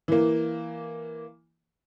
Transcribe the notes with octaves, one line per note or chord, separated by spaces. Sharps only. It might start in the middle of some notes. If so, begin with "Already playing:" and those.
E3 A#3